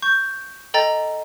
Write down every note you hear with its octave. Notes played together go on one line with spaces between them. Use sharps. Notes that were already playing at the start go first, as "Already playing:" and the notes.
C#6 G6
A4 D#5 G5 A#5 A6